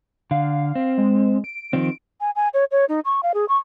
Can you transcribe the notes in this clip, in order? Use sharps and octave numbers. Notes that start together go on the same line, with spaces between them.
D3 F5
C4
G#3
D7
D#3 F3 C4
G#5
G#5
C#5
C#5
D#4
C#6
F5
G#4
C#6